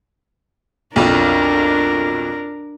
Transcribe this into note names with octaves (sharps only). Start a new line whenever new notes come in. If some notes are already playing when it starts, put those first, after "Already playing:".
B1 F2 D4 A#4